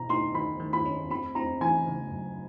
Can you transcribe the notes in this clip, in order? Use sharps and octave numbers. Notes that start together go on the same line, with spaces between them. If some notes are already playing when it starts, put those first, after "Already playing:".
Already playing: B2 B3 A#5
D#4 C6
D#3 B5
D#3
B5
C#4
C4 B5
C4 A#5
E3 G#5
C#3
F#2